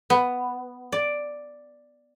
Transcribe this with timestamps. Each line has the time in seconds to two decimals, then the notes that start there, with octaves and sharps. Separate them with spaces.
0.10 B3
0.92 D5